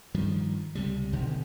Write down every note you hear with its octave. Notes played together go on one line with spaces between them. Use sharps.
G2 D#3 F3
C#2 C3 G3
F#1 B2 D3 D#3